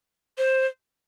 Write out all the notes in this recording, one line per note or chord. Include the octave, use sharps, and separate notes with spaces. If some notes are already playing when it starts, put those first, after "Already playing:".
C5